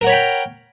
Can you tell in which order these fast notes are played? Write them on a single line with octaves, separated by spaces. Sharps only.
A#4 F#5 C#5 B5 G5